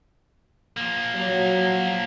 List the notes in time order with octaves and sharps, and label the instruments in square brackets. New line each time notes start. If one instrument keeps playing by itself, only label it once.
[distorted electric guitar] F3 A#3
[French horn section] F#3